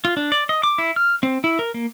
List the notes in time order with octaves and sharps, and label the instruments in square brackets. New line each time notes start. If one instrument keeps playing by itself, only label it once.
[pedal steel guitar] F4
D4
D5
D#5
D6
E4
F6
C4
E4
A#4
A#3